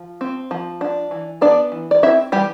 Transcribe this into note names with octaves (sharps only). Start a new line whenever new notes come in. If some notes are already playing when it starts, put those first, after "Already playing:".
Already playing: F3
C4
F3
D4
E3
B3 D4 D5
E3
D5
C4 E4 E5
E3 G3 G4